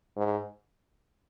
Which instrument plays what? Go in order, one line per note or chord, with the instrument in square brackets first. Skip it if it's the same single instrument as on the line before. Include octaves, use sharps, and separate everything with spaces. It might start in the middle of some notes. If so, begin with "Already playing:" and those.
[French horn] G#2